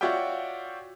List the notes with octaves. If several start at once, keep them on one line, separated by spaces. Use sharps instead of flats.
F4 F#4 C#5 D5 E5 G5